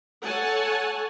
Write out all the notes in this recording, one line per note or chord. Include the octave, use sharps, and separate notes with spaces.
A4 C#5 F#5 G#5 A5